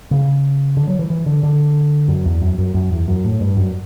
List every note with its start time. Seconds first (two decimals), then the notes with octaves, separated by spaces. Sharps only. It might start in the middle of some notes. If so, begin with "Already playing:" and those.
0.11 C#3
0.77 D3
0.88 F#3
0.99 E3
1.10 E3
1.26 D3
1.43 D3
2.08 F#2
2.25 E2
2.42 F#2
2.58 F#2
2.74 F#2
2.92 E2
3.08 F#2
3.24 A2
3.41 G2
3.57 F#2